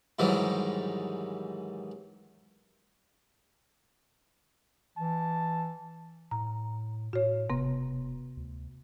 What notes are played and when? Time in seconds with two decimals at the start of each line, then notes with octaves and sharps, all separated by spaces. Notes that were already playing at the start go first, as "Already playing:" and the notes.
0.19 G#2 D#3 E3 F#3 G3
4.98 E3 A5
6.31 A2 A#5
7.13 A2 F#4 C#5
7.50 E1 C3 B3
8.37 D2